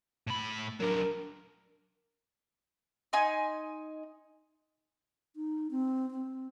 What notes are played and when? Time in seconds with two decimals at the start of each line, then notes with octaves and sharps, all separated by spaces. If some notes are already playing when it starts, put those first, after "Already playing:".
0.27 A2 B5
0.80 F#3 D4 A#4
3.13 D#4 G#5 C6
5.36 D#4
5.71 C4
6.11 C4